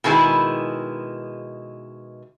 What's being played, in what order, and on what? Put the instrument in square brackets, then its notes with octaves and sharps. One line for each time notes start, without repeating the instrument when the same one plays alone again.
[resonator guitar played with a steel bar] B2 D#3 G#3 E4 G#4